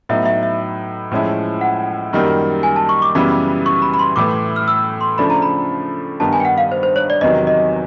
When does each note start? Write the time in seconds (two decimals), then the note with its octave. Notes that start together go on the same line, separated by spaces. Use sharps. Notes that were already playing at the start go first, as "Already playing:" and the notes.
0.09 A2 F#3 B3 D#4 E5
0.26 E5
0.43 E5
1.11 A2 F3 G#3 C#4 E4
1.61 F#5
2.13 F#2 D#3 G3 A#3 D#4
2.63 G#5
2.76 A5
2.89 C#6
3.02 D6
3.15 F#2 C#3 E3 G3 B3
3.66 C#6
3.82 B5
3.94 B5
3.99 C6
4.16 A2 E3 A3 D6
4.56 F6
4.68 E6
5.01 C6
5.18 C#3 F3 A3 D4 B5
5.30 A#5
5.42 B5
6.20 G2 D#3 G3 B3 D#4 A5
6.33 G#5
6.40 G5
6.45 F#5
6.58 F5
6.72 C5
6.83 C5
6.96 C#5
7.10 D5
7.21 E2 C3 D#3 F#3 D#5
7.47 D#5